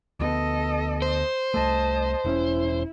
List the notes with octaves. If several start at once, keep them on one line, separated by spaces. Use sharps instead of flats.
D2 A#3 B3 A4 D#5
C5
C2 A3 D#5 A5
E1 C4 C#4 E4